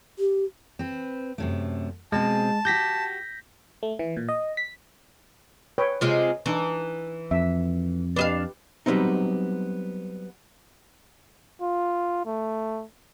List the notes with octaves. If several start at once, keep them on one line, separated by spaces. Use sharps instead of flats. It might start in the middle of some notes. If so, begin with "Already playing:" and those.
G4
C4 B4
F#2 C3 A3
B2 G#3 C4 G#4 A5
F#4 G4 G6 A#6 B6
A3
E3
A#2
D#5
B6
B4 C#5 G5
C3 G#3 F4
E3 D4 D#4 C#6
F2 E5
D4 G4 B4 D#5 F5
F#3 G3 A3 B3 C4 D#4
F4
A3